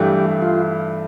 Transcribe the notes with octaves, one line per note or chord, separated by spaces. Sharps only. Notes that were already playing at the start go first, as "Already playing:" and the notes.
Already playing: G2 E3 A3 G4
F4